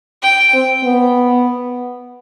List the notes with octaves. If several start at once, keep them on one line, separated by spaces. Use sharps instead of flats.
G5
C4
B3